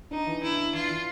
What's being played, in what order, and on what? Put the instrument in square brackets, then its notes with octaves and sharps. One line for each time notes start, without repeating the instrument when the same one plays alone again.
[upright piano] D4 [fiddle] D#4
[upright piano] E3
[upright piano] D4 [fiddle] E4
[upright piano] D4
[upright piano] E3 [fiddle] F4
[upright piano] E3